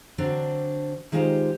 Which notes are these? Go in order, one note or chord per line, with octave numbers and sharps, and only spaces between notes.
D3 F#3 C4 D4
D#3 G#3 D#4 F4 G4 C5